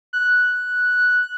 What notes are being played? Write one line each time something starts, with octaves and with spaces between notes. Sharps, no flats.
F#6